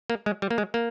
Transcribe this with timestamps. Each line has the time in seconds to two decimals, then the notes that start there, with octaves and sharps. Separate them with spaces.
0.10 A#3
0.26 G#3
0.42 G3
0.50 A#3
0.58 G#3
0.74 A#3